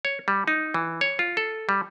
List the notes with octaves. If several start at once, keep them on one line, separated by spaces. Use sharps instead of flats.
C#5
G3
D#4
E3
C#5
F4
A4
G3